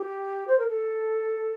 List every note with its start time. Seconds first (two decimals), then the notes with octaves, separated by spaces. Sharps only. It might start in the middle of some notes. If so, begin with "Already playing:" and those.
Already playing: G4
0.48 C5
0.59 A#4
0.68 A4